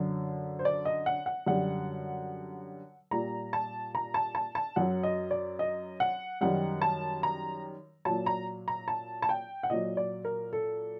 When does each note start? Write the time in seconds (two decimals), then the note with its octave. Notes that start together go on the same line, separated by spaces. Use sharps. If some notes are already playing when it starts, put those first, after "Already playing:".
Already playing: F#2 D3 F#3
0.59 C5
0.65 D5
0.85 D#5
1.06 F#5
1.26 F#5
1.46 F#2 D3 G3 F#5
3.11 A#2 G3 A#5
3.53 A5
3.95 A#5
4.14 A5
4.35 A5
4.55 A5
4.76 F#2 F#3 F#5
5.03 D#5
5.31 D5
5.59 D#5
6.00 F#5
6.41 F#2 D#3 G3 F#5
6.82 A5
7.23 A#5
8.05 A#2 F#3 A5
8.26 A#5
8.68 A#5
8.88 A5
9.22 A5
9.29 G5
9.63 F#5
9.70 A#2 F#3 D#5
9.97 D5
10.25 A#4
10.53 A4